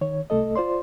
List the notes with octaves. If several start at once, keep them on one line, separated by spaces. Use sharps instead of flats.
D#3 C#5
C2 A3 A4 D#5
F4 C5 D5 C6